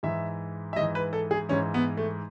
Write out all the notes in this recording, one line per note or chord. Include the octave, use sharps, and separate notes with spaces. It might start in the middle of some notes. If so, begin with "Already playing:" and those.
G#2 E3 E5
E5
G#2 E3 D#5
B4
A4
G#4
G#2 E3 C#4
B3
A3